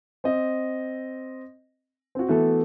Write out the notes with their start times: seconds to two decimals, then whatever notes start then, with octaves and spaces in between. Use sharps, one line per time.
0.24 C4 D#5
2.15 C4 F#4
2.29 E3 A3 B3 F#4 A4